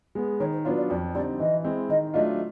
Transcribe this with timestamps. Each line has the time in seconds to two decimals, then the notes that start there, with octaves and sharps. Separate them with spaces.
0.15 G#3 B3
0.40 D#3 C#5
0.53 C5
0.65 F#3 B3 D4 F4 C#5
0.77 D5
0.90 F2 D5
1.14 D3 G3 C4 D#4 D5
1.40 E3 D#5
1.64 G#3 C4 E4
1.89 D#3 D#5
2.14 F#3 A3 D4 F4 D#5